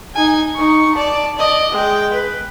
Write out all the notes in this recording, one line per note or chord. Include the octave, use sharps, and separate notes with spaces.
D#4 G#5
D#4 C#6
D5 A5
D5 D#5
G#3 G5
B4